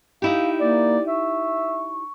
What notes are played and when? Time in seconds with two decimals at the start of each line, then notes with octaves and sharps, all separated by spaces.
0.22 D#4 E4 G4 F5
0.60 A#3 D5
1.07 E5 C#6